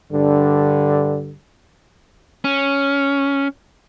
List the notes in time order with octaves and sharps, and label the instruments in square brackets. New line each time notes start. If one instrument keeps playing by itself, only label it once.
[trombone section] G2 D3
[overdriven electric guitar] C#4